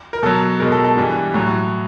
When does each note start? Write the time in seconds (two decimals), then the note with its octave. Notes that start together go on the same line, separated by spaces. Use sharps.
0.13 A#4
0.23 B2 F#3 A4
0.60 B2 G#3 A#4
0.72 A4
0.84 A4
0.97 G2 E3 G3
1.34 A2 F#3